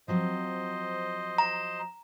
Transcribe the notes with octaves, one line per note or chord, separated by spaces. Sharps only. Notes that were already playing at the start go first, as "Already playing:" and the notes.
F3 F#3 C4 C5 D#5
A#5